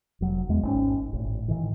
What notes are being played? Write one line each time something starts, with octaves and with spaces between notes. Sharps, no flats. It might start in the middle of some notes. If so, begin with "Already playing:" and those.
F1 F#3
E2 G#3 B3
G#1 C4 C#4
G#1 A2
A2 D#3 E3